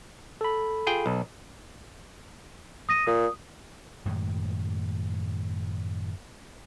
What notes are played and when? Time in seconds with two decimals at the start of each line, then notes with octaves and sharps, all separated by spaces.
0.41 A4 B5
0.87 F4 G#4 G5
1.06 B1
2.89 D#6 A#6 D#7
3.07 A#2 D#6
4.05 F#2 A2 D#3 G#3